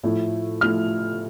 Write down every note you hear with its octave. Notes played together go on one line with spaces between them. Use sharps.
A2 F3 A3 E4
F3 A3 E4 F6